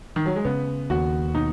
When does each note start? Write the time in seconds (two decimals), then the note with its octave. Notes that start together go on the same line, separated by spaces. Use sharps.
0.16 D#3
0.26 F#3
0.36 G#3
0.45 C#3 B3
0.90 D#2 F#4
1.35 B2 D#4